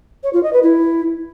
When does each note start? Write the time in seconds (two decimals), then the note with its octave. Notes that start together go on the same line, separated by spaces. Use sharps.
0.23 C#5
0.33 F4
0.43 D#5
0.53 B4
0.62 E4